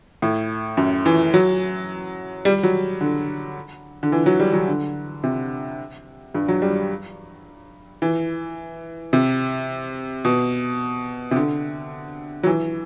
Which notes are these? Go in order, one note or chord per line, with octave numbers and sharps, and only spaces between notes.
A2
F#2
E3
F#3
G3
F#3
D3
D3
E3
F#3
G3
F#3
D3
C3
G2
F#3
G3
E3
C3
B2
C3
D3
F#3
E3